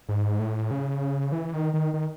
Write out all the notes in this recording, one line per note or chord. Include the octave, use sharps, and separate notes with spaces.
G#2
A2
C#3
E3
D#3
D#3
D#3